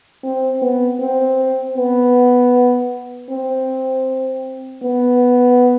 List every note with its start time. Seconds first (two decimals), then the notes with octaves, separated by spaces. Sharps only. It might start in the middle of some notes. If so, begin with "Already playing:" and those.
0.23 C4
0.62 B3
1.00 C4
1.77 B3
3.30 C4
4.83 B3